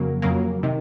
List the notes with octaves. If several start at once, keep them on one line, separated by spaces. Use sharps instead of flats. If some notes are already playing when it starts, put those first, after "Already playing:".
Already playing: F2 C#3 F#3 A#3
F2 C#3 F#3 A#3
C3 D#3